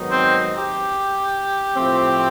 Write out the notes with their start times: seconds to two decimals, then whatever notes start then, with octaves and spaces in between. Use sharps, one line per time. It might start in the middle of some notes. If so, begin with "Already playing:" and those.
Already playing: G#2 D#3 F#3 B3 D#4
0.11 C4
0.58 G4
1.76 A2 F3 A3 C4